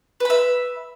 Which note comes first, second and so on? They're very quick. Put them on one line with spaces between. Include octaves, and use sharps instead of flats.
B4 B5 E5